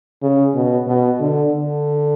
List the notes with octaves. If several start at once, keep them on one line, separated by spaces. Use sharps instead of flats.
C#3
B2
B2
D3
D3